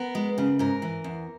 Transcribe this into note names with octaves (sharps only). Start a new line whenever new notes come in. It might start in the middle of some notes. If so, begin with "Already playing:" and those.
Already playing: B3 A#4
G#3
C#3
G#2 A#4
E3
E2